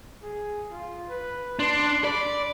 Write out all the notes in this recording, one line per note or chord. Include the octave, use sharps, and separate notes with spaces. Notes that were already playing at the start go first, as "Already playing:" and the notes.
G#4
F4
B4
D4 C6
D5 B5